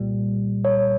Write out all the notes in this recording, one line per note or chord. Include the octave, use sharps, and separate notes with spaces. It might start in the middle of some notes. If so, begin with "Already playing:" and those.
Already playing: C2 A#2 G3
C#5